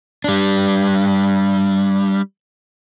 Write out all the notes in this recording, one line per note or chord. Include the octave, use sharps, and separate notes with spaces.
G3 D4